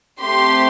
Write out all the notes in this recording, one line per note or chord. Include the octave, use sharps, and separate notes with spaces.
A3 C4 G4 C6